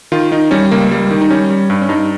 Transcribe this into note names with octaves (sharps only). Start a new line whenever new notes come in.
D#3 F4
D#3 D#4
G3 C#4
C#2 A#3
G3
D#3
D#4
G3 C#4
G3
G2
C#4
G2 D#4